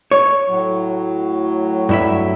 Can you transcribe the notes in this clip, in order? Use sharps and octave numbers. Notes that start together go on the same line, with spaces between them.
C#5
A2 F#3
G2 E4 E5